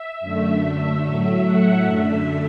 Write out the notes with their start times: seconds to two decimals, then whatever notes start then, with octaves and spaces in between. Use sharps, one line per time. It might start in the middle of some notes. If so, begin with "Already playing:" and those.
Already playing: E5
0.20 F#2 D3 A3
1.03 A2 F#3 A3
1.44 F#5
1.85 F#2 D3 A3 E5